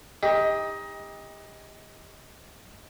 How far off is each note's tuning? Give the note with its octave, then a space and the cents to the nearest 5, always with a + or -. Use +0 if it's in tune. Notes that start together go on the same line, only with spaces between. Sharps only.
D#4 +20 G4 +35